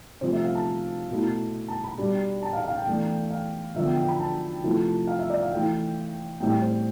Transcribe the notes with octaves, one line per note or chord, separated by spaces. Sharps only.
C3 F3 A3 C4 C5
E5
F5
A5
B2 A3 E4
A5
B5
B2 G3 D4
A5
F5
F5
G5
E3 A3 D4
F5
D3 F3 B3 E5
G5
G5
B5
A5
C3 F3 A3 E4
F5
E5
D5
F5
E3 A3 E4 G5
A2 G3 C4 E4 G5
C5